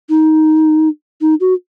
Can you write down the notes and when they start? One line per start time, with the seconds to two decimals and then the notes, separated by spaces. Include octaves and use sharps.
0.10 D#4
1.21 D#4
1.40 F#4